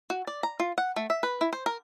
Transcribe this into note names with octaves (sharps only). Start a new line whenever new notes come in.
F#4
D5
A#5
F4
F#5
A3
E5
B4
E4
C5
A#4